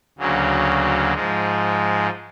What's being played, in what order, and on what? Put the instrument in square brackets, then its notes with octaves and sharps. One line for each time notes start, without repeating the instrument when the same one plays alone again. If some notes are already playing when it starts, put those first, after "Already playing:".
[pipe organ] D2 C#3 F#3 A#3
G#2 F3 G#3